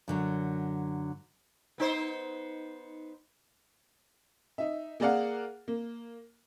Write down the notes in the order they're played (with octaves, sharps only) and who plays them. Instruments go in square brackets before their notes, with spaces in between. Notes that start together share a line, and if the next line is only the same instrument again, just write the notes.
[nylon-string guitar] F#2 D3 F#3
[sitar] B3 D#4 C5
[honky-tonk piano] D#4 E5
A#3 G#4 A#4 D5 F5 F#5
A#3